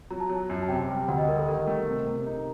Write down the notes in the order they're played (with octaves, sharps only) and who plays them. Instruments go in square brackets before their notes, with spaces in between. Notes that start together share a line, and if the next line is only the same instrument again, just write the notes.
[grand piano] F#3 [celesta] A#5
[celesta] A5
[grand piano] F#3
F#2
[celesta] A5
[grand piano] C3 [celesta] G5
[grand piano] G3
[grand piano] D2 [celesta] F#5
[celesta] D#5
[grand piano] G3 [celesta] A#4
[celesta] A4
[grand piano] D#3 [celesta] A#4
[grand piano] A3
C3
C3
D#4